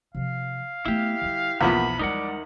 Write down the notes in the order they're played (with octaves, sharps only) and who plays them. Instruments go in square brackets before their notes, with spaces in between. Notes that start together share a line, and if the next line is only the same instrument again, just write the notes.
[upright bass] C3 F3 [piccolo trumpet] F5
[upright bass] A3 B3 [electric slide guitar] E4 G4
[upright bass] D3 G3
[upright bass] B1 [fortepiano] E2 F3 B3 [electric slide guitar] A#3 [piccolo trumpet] B5
[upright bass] G3 G#3 [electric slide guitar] D#4 A#4 F#5 [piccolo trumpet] D5